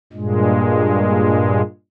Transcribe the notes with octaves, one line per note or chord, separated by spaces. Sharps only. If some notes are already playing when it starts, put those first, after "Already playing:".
G2 A#2 G#3